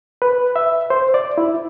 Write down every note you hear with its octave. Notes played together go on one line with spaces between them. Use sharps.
B4
E5
C5
D5
E4